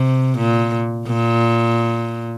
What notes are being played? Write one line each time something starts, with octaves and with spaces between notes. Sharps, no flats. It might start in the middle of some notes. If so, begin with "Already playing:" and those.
Already playing: C3
A#2
A#2